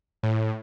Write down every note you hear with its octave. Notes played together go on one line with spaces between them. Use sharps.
A2